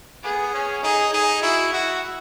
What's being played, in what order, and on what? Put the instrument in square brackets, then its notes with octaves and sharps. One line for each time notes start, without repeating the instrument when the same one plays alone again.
[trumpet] B3 [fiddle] G#4
[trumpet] C#4
[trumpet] D#4 [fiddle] G#4
[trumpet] D#4 [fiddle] G#4
[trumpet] E4 [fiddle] F#4
[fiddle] E4 [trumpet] F#4